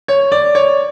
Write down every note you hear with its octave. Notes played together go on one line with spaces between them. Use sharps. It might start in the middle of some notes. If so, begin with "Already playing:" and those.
C#5
D5
C#5